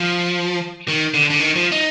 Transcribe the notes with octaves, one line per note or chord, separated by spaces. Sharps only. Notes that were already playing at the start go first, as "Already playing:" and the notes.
Already playing: F3
D#3
D3
D3
D#3
F3
D#4